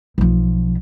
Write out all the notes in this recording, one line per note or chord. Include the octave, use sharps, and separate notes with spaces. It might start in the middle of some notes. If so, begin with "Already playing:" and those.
B1 F3